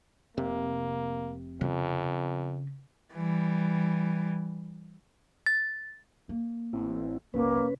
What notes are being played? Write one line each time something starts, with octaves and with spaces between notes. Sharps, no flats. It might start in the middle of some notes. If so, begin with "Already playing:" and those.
F1 C3 A#3
F2 C#3
E3 G3
A6
A#3
A1 C4 E4
F1 B1 A#3 C#4 B4